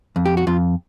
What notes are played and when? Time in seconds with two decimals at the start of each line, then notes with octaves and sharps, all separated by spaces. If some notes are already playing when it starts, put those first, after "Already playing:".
0.16 F2
0.26 G4
0.37 F#4
0.47 F2 F4